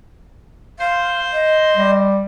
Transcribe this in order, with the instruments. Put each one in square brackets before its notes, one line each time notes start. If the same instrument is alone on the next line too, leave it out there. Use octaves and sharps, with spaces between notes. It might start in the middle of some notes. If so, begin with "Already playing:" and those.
[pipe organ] C5 C6 [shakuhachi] F5
[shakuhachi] D#5
[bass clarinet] G3